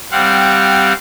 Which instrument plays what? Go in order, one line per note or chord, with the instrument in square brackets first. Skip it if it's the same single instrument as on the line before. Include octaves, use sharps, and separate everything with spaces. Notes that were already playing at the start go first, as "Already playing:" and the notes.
[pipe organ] G3 C4 F5 F#5